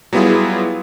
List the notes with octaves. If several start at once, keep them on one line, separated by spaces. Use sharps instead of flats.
F#3 G3 B3 E4 F4 G#4